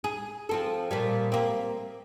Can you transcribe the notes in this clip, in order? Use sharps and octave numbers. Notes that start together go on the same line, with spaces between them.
G#4
F3 C4 A4
A#2 F3 G3
A#3 C4